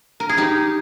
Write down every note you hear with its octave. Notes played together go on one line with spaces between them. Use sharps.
A#4
G#4
D#4 G4